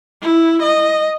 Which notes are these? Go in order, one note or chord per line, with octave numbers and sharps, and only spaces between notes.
E4
D#5